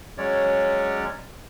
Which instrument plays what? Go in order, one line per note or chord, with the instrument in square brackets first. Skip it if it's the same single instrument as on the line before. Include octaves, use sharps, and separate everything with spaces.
[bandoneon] F#3 G#3 C#4 C#5 D5